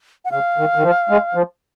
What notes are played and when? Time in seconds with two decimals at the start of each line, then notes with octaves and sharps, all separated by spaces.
0.25 F#5
0.31 C#3 F5
0.57 D#3
0.75 D#3
0.83 F3
1.09 G#3
1.35 F3